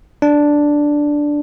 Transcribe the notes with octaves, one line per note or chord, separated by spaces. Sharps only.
D4